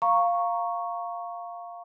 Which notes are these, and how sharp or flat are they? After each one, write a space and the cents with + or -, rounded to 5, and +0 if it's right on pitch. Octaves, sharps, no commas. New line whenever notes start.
F5 +0 A#5 +0 C#6 +0